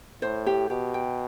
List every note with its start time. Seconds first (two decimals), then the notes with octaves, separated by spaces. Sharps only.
0.22 A2 C5
0.46 G4
0.70 B2 G4
0.94 G5